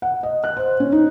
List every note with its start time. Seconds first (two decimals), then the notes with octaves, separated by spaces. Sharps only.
0.02 F#5
0.23 D#5
0.44 F#6
0.57 C5
0.80 C#4
0.92 D#4